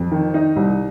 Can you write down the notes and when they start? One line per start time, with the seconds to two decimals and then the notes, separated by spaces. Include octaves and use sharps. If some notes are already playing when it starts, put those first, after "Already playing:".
Already playing: F2
0.12 D#3
0.34 D#4
0.56 C2